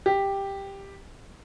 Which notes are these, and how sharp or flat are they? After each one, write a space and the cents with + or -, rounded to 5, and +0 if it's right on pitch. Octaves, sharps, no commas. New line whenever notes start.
G4 +5